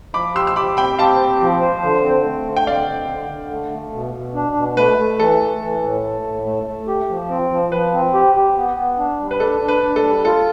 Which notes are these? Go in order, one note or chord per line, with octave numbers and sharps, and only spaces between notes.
F3 B5 D6
G4 C6 E6
E6
G4 B5 D6
C4 G5 B5
G4 F5 A5
C4
F3
C5
D3
C4
A3
D3
G5
C4 D5 F5
D3
D3
D3
A3
A3
B2
B2
D4
B2
A3 B4
A3
E3 A4
A3
E3
A2
A3
A2
A3
A3
G4
F3
C4
F3
F3 B4
C4
G4
G4
B3
B3
D4
G3
B4
D4 A4
D4
B4
D4
A4
G3
F4 A4